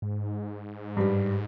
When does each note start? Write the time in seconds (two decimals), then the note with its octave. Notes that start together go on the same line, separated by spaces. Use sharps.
0.02 G#2
0.97 G2 G3